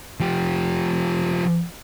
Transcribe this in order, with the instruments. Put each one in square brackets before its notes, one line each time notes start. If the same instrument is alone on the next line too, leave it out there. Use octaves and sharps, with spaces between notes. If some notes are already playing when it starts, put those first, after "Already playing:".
[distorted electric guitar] F3 G4